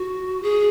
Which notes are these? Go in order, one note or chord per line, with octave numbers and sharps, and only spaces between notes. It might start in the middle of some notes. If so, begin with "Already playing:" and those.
Already playing: F#4
G#4